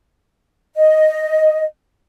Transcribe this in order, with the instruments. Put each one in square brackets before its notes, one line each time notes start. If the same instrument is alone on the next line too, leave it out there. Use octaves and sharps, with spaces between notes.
[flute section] D#5